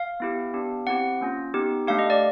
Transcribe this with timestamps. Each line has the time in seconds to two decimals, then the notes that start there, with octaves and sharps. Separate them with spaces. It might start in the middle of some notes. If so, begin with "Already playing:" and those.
Already playing: F5
0.20 B3 E4 G4
0.54 B3 D4 G4
0.87 C4 E4 G4 F#5
1.21 A#3 C#4 F4
1.54 B3 D#4 G4
1.87 A3 D4 G4 F5
1.99 D#5
2.10 D5